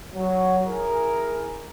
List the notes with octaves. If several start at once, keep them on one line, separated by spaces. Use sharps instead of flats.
F#3
E4 G#4 A#4